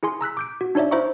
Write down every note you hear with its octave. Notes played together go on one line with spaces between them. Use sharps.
E4 G#4 G#5 C6
A#5 E6 F#6 B6
D6 G6 D7
F#4
D4 D#4 C#5 D5 E5
E4 C5 E5 A#5 C#6